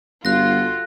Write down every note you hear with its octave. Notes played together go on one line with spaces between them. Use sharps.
G1 F4 F#4 A4 F#6 A#6